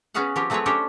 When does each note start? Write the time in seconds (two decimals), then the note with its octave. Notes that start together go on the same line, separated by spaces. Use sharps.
0.14 B3 C#4 F#4 G#4 F5 F#5
0.36 F3 B3 C4 G4 C#5
0.50 F#3 A3 C4 G#4 B4 C#5
0.66 C#4 D4 G4 A4 C5 C#5